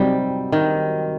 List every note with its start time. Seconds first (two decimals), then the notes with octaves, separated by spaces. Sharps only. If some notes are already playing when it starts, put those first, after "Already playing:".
Already playing: C3 F#3 G3 C4 D#4
0.52 D#3